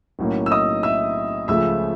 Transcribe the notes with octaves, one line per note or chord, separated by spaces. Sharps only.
B1 A2 F#3 A#3 C#4
E6
D#5 D#6
E5 E6
C#2 C#3 F3 A3 E5 E6